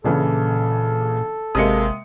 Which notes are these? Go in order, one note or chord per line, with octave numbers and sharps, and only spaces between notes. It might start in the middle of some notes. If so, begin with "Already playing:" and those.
A#1 A#2 C#3 E3 A4
G#1 C3 G#3 A#3 D#6 C#7